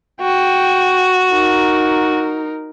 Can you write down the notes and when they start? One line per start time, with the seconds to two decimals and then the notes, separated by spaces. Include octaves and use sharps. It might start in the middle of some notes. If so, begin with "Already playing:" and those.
0.21 F#4 G5
1.32 D#4 A#4